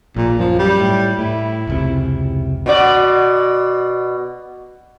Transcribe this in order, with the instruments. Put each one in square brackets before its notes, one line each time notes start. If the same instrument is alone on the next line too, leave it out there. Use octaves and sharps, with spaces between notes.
[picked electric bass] A#1 [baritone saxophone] A#2
[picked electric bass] F#2 [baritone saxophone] F3
[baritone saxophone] G3
[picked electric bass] A2
[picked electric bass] A2 [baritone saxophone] E4
[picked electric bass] F1 C#2 C3
[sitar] B2 F#4 D5